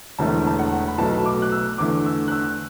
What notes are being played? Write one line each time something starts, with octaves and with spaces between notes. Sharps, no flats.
E1 E2 D3 A3 A5
A5
F#5
B5
B1 B2 F#3 A3 A5
D6
F#6
E6
E2 D3 A3 D6
E6
F#6
E6